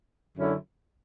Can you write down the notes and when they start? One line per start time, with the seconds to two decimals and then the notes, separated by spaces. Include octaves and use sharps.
0.37 F#2 D3 F#3 C#4 E4